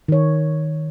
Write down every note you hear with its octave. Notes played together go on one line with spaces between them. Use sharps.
D#3 C#5